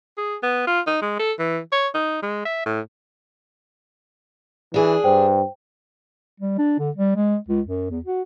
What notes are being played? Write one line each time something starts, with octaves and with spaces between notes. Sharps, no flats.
G#4
B3
F4
D#4
G#3
A4
E3
C#5
D#4
G#3
E5
A2
E3 D4 G#4
G2 C5 G5
G3
D4
D3
G3
G#3
C#2
F#2
E2
F#4